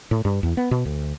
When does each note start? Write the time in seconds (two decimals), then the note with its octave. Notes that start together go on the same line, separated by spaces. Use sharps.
0.11 A2
0.25 G2
0.43 E2
0.57 B3
0.71 B2
0.85 D2